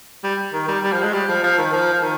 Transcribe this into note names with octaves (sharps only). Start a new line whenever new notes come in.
G3
D#3
G3
G3
F3
G#3
G3
F3
F3
D#3
F3
F3
D#3